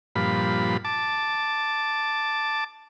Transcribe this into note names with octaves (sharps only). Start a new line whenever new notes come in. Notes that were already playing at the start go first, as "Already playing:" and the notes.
G2 A#2 F3 B5
A5 D6